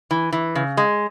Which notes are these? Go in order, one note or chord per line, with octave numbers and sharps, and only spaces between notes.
E3
E3
C#3
G#3